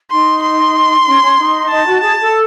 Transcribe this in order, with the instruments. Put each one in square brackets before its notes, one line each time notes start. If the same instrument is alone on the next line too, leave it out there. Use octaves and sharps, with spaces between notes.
[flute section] D#4 [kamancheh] C6
[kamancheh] C6
[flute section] C#4
C#4
D#4
[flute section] D#4 [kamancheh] A5
[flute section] F#4
[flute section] G#4 [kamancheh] A5
[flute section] A4